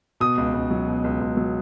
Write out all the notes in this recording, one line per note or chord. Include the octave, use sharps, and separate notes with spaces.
B2 D#6
C#2
C#2
F#3
B2
C#2
C#2
F#3